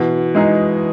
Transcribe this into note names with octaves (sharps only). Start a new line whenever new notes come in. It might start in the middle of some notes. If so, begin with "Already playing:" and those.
Already playing: B2 E3
G#3 D#4 G#4